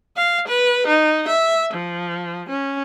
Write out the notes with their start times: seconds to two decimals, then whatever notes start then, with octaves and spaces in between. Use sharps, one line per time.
0.17 F5
0.48 B4
0.87 D#4
1.28 E5
1.74 F3
2.49 C#4